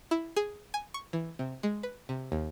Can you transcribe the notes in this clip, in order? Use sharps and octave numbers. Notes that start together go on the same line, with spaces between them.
E4
G#4
G#5
C#6
E3
C3
G#3
B4
C3
D#2